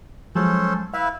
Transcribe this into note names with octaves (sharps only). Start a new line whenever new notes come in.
F3 F#3 G#3 C#4 A4 C5
E4 B4 E5 F5